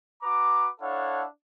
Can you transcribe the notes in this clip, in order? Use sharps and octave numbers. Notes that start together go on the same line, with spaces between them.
F#4 B4 A#5 D6
D4 E4 A4 C#5 F5 F#5